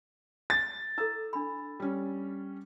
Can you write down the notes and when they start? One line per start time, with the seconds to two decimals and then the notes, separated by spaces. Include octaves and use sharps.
0.50 A6
0.98 E4 A4 E6
1.33 D4 B5
1.80 G3 C#4